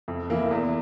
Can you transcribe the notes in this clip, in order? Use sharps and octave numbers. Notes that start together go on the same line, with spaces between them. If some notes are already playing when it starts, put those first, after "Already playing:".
F2
E3 A#3 E4
E2